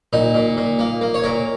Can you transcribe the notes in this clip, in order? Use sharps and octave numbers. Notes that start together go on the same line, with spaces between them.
A#2 D#4
A#2
A#2
A#3
A#3
C#5
A#2 A#4